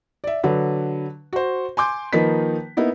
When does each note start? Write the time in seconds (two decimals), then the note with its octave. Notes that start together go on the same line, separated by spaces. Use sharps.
0.24 D5 E5
0.43 D3 F#3 B4
1.33 F#4 C5
1.77 G#5 C6 D6 G6
2.13 D#3 F3 A#3 D#4 B4 B6
2.77 A#3 B3 D#4 E4